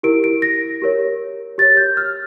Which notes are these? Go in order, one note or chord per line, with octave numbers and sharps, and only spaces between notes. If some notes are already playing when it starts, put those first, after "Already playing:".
E4 G4 A#4 D7
D7
A#6
G4 A#4 C#5
G4 C#5 A6
G6
F6